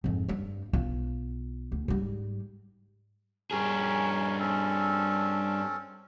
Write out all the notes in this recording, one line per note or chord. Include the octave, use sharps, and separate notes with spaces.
F2 G#2
G2 G3
B1 F4
D2
G#2 G3
G2 C#4 G#4 A#4 C#5
C4 C#4 A4